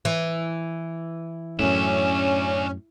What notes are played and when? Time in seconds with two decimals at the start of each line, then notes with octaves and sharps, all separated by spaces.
0.05 E3
1.59 F#2 A2 C#4 D4 E5